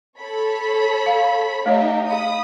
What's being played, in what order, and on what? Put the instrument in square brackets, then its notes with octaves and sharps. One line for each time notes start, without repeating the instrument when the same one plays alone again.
[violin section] A4 C#5 B5
[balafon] F5
[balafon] A3 C#5 D#5 [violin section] D#4 G4 E5
[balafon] G#4 F5 [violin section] B5 D#6